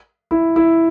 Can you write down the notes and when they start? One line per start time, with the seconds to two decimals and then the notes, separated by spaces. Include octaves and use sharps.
0.31 E4
0.56 E4